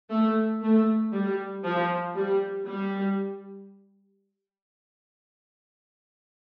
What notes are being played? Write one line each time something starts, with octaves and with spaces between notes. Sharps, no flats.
A3
A3
G3
F3
G3
G3